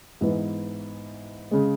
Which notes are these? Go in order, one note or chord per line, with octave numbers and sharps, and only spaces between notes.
G#2 E3 B3
C#3 G#3